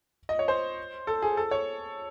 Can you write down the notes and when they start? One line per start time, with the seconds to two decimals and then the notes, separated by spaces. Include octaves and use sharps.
0.29 D#5
0.39 C#5
0.48 C5
1.07 A4
1.22 G#4
1.37 A4
1.51 C#5